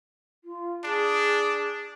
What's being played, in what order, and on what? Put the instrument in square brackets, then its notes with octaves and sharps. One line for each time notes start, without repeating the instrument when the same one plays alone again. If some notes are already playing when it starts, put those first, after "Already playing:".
[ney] F4
[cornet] D4 [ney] G#4